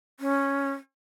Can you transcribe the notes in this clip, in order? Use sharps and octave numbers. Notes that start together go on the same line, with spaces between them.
C#4